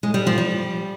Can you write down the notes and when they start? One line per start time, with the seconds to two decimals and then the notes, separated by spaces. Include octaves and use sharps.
0.03 G#3
0.14 G3
0.27 F3
0.38 G3